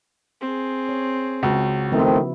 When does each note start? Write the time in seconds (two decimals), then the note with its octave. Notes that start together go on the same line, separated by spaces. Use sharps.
0.41 C4 G#4
0.89 C#5
1.43 C#2 C#3 F#4
1.92 D#3 F3 A3 B3 C4 E4